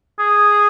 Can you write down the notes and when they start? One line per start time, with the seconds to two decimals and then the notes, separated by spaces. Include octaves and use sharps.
0.19 G#4